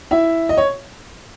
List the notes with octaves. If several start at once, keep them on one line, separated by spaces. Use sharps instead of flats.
E4 E5
D#5
C#5